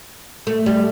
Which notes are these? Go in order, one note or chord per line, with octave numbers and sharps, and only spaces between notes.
A3
G3